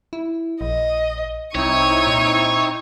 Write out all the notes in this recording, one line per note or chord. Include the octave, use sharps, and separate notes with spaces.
E4
A#1 D#5
C2 C4 D#4 E4 C#5 C#6 D#7
A#2